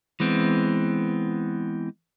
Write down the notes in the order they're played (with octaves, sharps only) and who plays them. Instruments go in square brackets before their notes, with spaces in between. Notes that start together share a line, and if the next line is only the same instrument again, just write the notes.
[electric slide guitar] E3 G#3 B3 C4